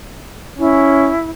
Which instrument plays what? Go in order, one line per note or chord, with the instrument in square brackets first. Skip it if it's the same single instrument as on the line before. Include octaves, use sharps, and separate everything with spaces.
[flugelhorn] C#4 [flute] E4